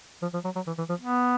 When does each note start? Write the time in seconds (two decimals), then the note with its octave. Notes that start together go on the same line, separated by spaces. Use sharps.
0.22 F3
0.34 F3
0.45 F#3
0.56 F#3
0.67 E3
0.78 E3
0.89 F3
1.01 B3